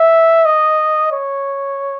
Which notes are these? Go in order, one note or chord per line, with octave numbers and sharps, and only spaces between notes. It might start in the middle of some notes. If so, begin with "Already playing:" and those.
Already playing: E5
D#5
C#5